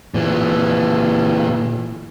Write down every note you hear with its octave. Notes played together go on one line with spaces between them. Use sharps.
A#2 E3